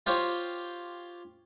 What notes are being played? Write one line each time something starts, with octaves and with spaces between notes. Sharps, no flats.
F4 G4 C5 C#5